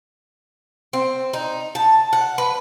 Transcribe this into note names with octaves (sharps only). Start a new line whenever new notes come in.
C4
D#4
A5
F#5
B4